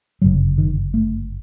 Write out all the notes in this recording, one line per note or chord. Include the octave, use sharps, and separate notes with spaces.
G1 F#2 C#3 F#3
D#3
A3